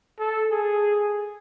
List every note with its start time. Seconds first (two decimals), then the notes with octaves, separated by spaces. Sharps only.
0.19 A4
0.51 G#4